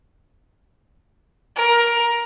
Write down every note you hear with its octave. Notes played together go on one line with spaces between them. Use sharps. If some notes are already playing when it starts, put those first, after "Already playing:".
A#4